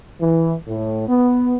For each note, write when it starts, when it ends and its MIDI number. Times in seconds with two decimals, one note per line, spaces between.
0.20 0.54 52
0.66 1.07 45
1.08 1.55 59